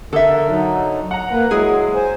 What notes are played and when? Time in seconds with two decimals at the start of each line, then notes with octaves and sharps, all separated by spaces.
0.13 D3 A4 A#4 E5
0.48 F#3 D#4
1.11 F#5 A#5
1.31 A#3 B4
1.51 F#3 G#3 E4 G#4
1.95 C5 G#5